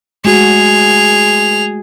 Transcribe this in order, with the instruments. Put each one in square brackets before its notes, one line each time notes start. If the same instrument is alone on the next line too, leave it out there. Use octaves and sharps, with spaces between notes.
[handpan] G#3 A3 F#4 [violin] G#4 F7